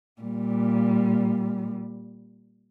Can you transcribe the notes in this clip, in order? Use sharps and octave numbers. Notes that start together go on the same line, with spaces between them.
A#2 G3